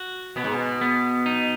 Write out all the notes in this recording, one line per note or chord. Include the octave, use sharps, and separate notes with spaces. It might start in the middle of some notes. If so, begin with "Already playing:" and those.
Already playing: F#4
B2 B3
G#2
B2
B3
D#4